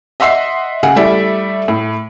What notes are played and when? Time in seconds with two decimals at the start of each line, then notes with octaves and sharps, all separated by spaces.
0.20 D#5 E5 F#5 C6 E6 C7
0.83 C#3 G#4 F#5
0.96 G3 A3 E4 D5 E5
1.68 A2